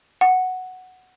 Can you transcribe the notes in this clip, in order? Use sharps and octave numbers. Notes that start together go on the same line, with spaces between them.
F#5